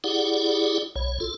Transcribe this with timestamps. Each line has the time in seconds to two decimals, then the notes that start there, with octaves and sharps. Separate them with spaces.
0.04 E4 G4 G#4 D5 F#5
0.96 B1 C#5
1.20 F4 A4